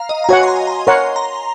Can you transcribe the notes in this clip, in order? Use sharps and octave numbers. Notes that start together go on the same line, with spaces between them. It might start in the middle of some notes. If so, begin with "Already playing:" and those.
Already playing: F5 A#5
D#5
A#5
F#4 C#5 F#5 G#5
C6
A#5
A#5
A#4 C#5 F#5 C6
A#5